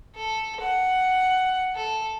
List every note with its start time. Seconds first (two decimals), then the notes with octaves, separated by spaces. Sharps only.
0.16 A4
0.61 F#5
1.76 A4